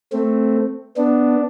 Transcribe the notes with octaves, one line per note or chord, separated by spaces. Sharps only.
A3 C4
B3 D4